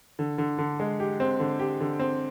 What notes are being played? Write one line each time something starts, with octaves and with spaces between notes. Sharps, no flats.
D3
D3
D3
G#3
G4
C4
D3
G4
D3
C4